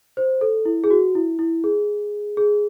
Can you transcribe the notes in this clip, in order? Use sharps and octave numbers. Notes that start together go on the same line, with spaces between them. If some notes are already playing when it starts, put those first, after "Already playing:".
C5
A4
E4
G#4
F#4
E4
E4
G#4
G#4